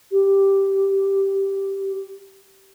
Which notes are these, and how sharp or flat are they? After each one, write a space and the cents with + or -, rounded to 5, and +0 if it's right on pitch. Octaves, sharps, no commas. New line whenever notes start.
G4 -5